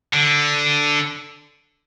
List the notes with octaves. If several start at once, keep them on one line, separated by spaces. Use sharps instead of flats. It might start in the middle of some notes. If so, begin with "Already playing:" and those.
D3